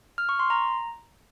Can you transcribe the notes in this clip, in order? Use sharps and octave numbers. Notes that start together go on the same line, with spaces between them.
F6
C#6
C6
A#5